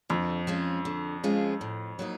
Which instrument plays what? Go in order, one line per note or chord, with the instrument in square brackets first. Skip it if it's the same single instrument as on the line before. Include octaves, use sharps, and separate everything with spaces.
[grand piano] F2 [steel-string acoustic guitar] D3
[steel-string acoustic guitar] F3 G#3 C#4 F4
D3
F3 G#3 C#4 F4
A2
F#3 A#3 D#4